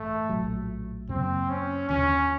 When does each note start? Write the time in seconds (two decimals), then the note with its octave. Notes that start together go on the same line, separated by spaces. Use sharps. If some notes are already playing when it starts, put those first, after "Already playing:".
Already playing: A1 G2 A3
0.29 A#1 A2 F#3
1.09 F#2 C#3 F#3 A#3 C4
1.50 C#4
1.89 D#2 D3 F3 C#4